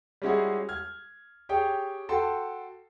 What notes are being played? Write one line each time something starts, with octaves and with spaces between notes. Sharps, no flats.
G3 G#3 C#4 E4 F#4 G#4
F6 G#6
G4 G#4 C#5 G5
F#4 A4 G5 A5 C6